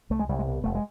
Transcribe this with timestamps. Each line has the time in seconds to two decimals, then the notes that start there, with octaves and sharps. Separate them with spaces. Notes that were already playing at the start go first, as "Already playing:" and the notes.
0.10 C2 A3
0.19 G#3
0.29 C2 G3
0.39 G#3
0.46 B2
0.64 F1 A3
0.75 G#3